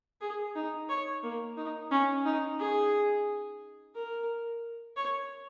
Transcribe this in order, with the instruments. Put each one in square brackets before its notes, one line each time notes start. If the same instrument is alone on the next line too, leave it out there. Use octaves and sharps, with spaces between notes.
[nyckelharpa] G#4
D#4
C#5
A#3
D#4
C#4
D#4
G#4
A#4
C#5